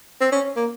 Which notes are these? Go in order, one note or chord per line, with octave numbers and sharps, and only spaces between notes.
C4
C#4
A#3